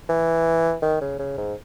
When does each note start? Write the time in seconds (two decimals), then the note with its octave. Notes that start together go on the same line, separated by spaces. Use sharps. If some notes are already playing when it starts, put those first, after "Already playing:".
0.09 E3
0.82 D#3
1.01 C#3
1.19 C#3
1.37 G#2